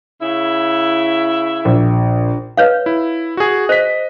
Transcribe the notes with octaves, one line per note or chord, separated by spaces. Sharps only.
C#3 E4
A#1
B4 C#5 F5
E4
F#4 G#4
C5 D#5 B6